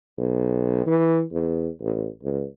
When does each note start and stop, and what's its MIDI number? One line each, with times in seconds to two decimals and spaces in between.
0.18 0.85 35
0.86 1.23 52
1.32 1.69 40
1.81 2.07 33
2.23 2.44 37